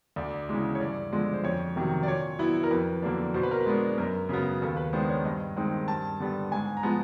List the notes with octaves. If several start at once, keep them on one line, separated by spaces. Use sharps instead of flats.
D2 D5
C#3 E3 G#3
C#5
G2 D5
D3 F3 G#3
C5
F2 C#5
C3 D#3 F#3
D5
A#2 C#5
F#3 B3 E4
A#4
F2 B4
D3 F#3 A#3 D4
B2 C5
B4
A#4
B4
G#3 B3 D4
F#2 A#4
C#3 F#3 B3
D#2 A4
B4
D#3 G#3 B3 D4 C5
C#5
G2 D#5
D#3 G#3 C4 D#4
G2 A5
D3 G3 B3
G#2 G#5
A#5
F3 G#3 B3 A5